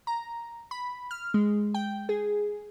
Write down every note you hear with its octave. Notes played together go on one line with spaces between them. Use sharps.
A#5
B5
F6
G#3
G5
G#4